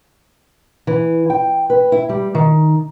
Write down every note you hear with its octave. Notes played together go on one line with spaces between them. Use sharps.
E3
G5
B4
E4
G3
D#3